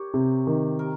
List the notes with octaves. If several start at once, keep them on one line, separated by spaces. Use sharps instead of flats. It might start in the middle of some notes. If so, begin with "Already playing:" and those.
Already playing: G4 A#4 C#5
C3
D#3
A#4